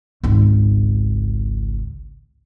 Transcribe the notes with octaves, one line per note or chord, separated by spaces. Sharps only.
G#1 C#2